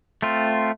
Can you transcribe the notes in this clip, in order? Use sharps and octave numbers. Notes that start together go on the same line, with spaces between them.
A3 C4 F4